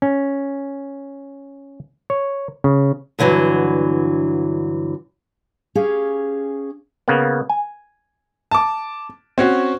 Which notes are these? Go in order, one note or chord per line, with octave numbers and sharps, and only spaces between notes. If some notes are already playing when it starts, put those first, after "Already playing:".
C#4
C#5
C#3
G2 D3 E3 F#3
C#4 G4 G#4 F5
C#3 A#3 B3
G#5
A5 D6
C4 C#4 F#4